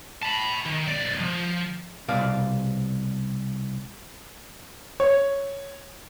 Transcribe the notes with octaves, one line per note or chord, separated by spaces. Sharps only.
A5 B5
D#3
B1 D5
F3
C2 B2 D5 F5
C#5